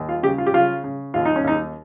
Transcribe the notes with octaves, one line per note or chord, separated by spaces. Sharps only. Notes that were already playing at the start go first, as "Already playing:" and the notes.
Already playing: D#2
F4
C#3 G4
F4
G4
C#3 F4
C#3
D#2 F4
D#4
C#4
D#2 D#4